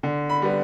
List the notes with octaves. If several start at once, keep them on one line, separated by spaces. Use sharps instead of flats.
D3
B5
G3 B3